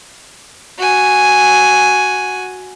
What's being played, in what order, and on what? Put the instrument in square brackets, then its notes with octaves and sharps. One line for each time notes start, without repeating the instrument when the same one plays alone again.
[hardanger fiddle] F#4 G#5